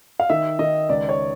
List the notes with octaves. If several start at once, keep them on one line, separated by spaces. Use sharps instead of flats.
F5
D#3 E5
D#3 D#5
C#2 D5
C#5